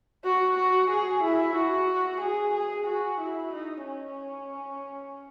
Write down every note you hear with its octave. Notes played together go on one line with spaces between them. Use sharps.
F#4
F#4
G#4
E4
F#4
G#4
G#4
F#4
E4
D#4
C#4